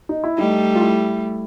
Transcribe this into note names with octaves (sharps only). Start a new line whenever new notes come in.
D#4
E4
G3 A3 D#4
F4
E4